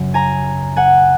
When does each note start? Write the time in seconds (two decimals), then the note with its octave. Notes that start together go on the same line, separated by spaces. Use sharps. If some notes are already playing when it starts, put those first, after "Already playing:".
Already playing: F#2 C#3 F#3
0.14 G#5 A#5
0.76 F#5 G#5